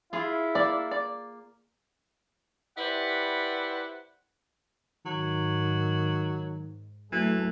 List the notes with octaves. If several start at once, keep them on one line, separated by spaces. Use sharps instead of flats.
E4 F4 G#4
A#3 D5
D5
E4 G4 B4 C5 D5 F#5
G#2 D#3 F#3
E3 F#3 A3